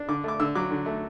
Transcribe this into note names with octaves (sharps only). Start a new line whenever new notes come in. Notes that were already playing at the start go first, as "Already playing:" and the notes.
Already playing: D4
D3 D6
A3 D6
D3 E6
F#3 D6
D3
A3